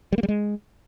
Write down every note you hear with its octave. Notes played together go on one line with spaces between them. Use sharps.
G3
A#3
G3
G#3